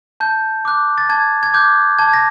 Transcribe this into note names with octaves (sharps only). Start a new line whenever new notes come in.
A5 G6
D6 F#6
A6
A5 G#6
G#6
D6 F#6 G6
A5 G#6
A#6